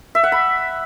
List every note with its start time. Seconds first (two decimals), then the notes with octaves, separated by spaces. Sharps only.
0.15 E5
0.24 F#5
0.32 B5